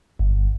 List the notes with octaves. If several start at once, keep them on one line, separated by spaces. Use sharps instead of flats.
G1